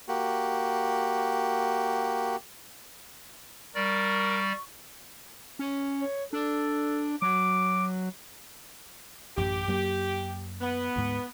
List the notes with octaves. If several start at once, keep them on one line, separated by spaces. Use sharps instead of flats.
A#3 F#4 G4
G3 A#4 D5 C#6
C#4
C#5
D4 A4
F#3 D6
A1 F#2 G4
F#2 F#3 A#3
B3
D2 G#2